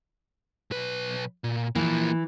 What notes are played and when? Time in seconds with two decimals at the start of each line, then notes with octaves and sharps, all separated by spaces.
0.71 B1 B4
1.44 A#2
1.75 E3 F3 A#3